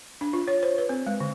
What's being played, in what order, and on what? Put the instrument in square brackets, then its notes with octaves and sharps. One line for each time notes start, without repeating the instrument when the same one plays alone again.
[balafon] D4
F4
C#5
C5
B4
C4
G#3
D3